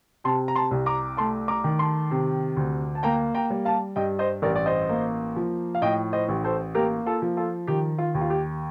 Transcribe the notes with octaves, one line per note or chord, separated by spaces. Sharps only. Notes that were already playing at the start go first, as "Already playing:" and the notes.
C3 A5 C6
A#5
A5 C6
C2
A#5 D6
A3 A5 C6
A#5 D6
D#3
A5 C6
C3
D2
A5
A#3 G5 A#5
G5 A#5
G3
F5 A5
G2 D#5 G5
C5 D#5
A1 A#4 D5
D5
C5 D#5
A#3
F3
F5
A2 D#5 G5
C5 D#5
A1
A4 C5
A#3 G4 A#4
F4 A4
F3
F4 A4
D#3 G4
F4
D#2
F4
G4